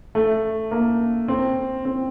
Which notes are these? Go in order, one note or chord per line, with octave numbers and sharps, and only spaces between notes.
A3
A#3
C4
C4